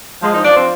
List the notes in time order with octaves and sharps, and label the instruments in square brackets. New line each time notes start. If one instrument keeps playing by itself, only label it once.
[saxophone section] F3 G#3
D#4
F3 D4
C4